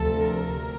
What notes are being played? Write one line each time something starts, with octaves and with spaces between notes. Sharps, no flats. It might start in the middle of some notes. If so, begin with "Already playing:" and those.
Already playing: D2 C3 F3 A4
A#4